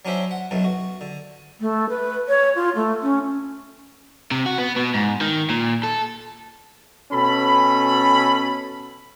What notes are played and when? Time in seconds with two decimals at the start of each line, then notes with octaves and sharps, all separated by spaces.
0.05 F#3 C#4 D4 C5 E5
0.31 F#5
0.51 B1 F#2 B2 A3
0.64 F#4
1.01 D3
1.61 A3
1.89 B4
2.28 C#5
2.56 F4
2.75 A3
3.02 C#4
4.31 C3
4.46 F#4
4.58 B3
4.76 B2
4.94 G#2
5.21 D#3
5.50 A#2
5.83 A4
7.12 B2 C#4 A4 B5